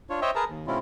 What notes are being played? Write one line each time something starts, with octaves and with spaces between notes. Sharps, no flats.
D4 F4 C#5
C5 C#5 D#5 E5 G5
G#4 A#4 B4 A5 A#5
D#2
B2 G#3 C4 C#4 E4 F4